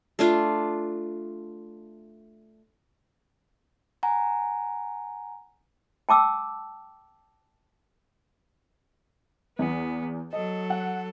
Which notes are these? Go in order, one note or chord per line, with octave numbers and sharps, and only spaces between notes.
A3 D4 F4
F#5 G#5 A#5
G5 A5 D6 E6
E2 B3
F#3 A4 D#5
F#5